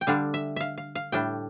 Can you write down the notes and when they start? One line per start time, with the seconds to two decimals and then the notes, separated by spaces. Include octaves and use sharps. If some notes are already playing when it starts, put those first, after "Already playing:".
0.01 G5
0.07 D3 G3 D4 F5
0.34 E5
0.56 E5 F5
0.78 F5
0.95 F5
1.12 A2 G3 D4 G5